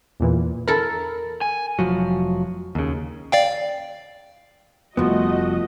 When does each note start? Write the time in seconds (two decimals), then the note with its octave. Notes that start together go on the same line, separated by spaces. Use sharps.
0.20 E2 A#2 E3
0.68 E4 A4 A#4
1.41 G#5
1.79 F1 F3 F#3
2.75 D#2 C#3
3.32 D5 F5 G5
4.97 F1 F3 G3 A3 B3 F#4 D#5